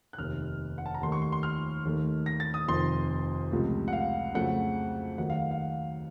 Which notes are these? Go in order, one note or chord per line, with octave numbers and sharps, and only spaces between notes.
F#6
F1 D#2 D#3 F6
F#5
A5
A#5
D#2 D#3 A3 C6
C#6
C6
C6
F6
D#2 D#3 A3
A#6
A6
D#6
F1 F2 D#3 C6
C#2 C3 F3 A3
F#5
F5
F2 C#3 F#3 A3 F#5
D#2 D#3 F#3 A3 F#5
F5
F5